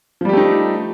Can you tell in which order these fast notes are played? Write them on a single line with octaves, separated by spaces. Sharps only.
F3 G3 G4 A3 D#4